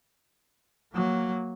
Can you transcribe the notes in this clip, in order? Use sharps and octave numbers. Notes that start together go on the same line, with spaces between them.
F#3 A#3